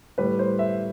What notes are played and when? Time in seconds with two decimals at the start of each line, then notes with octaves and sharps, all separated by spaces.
0.18 A2 G3 B4
0.39 C5
0.59 E5